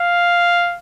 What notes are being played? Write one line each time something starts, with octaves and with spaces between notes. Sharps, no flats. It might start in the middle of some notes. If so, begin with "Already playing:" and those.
Already playing: F5